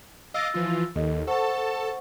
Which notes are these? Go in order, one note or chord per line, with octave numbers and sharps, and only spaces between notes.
D#5 F5 D6 E6 A6 A#6
E3 F3 F4
D#2 A4 D#5
A4 C5 F#5 A5 C#6